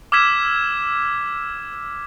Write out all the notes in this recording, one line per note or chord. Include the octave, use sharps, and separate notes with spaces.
D6 E6 F6 G#6 B6 E7